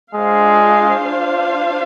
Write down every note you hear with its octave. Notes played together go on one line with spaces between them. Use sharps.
G#3 D4 F4 C5 F5